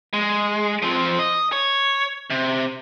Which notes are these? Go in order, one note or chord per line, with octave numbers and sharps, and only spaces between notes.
G#3
F3 C4
D#5
C#5
C3